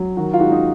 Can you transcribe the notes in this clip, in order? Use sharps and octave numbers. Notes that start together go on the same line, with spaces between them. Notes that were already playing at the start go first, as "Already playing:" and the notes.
Already playing: F#3
D#3 F#4 A#4
F4
G#3 D#4 F#4
D#4